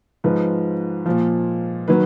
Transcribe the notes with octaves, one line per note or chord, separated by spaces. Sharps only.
G#2 F3 B4
A#2 F3
D#3 F#3 B4